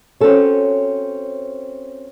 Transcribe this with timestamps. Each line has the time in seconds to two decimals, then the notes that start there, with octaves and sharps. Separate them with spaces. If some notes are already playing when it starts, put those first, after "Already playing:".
0.20 C4 C#4 D#4 F#4 A4 C#5